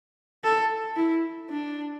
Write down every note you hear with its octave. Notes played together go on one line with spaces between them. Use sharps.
A4
E4
D4